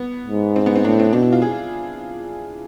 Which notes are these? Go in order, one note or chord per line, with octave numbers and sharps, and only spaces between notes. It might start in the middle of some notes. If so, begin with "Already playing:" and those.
Already playing: B3
G#2
C4
B3
C4
A2 D4
C4
B2 D4
E4
F4
G#4